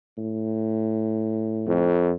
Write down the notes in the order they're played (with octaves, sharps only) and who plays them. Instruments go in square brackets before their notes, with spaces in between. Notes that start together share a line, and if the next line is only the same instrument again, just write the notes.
[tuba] A2
[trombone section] F2